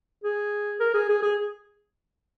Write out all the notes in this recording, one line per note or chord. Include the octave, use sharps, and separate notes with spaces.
G#4
A#4
G#4
G#4
G#4